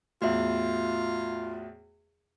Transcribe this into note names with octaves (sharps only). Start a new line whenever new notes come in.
E2 A2 F4 F#4 E5